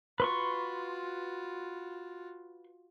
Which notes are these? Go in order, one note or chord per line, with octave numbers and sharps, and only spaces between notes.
F4 F#4 B4 C6 C#6